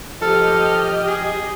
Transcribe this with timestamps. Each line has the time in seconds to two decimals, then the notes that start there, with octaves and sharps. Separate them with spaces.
0.22 F3 G4 A4 D#5 F6
1.07 G#4